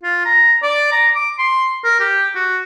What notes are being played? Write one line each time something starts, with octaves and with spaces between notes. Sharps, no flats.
F4
A#5
D5
A#5
D6
C6
A#4
G4
F#4